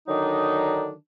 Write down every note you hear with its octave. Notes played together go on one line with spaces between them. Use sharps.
D3 D#3 F#3 D4 D#4